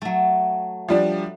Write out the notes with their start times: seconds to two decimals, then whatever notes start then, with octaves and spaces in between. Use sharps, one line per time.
0.02 F#3 A3
0.88 F3 G3 D4